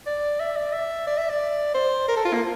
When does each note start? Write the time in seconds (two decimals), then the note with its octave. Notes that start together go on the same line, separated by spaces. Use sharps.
0.06 D5
0.40 E5
0.56 D5
0.73 E5
1.07 D5
1.18 E5
1.30 D5
1.74 C5
2.08 A#4
2.16 A4
2.25 F4
2.33 A#3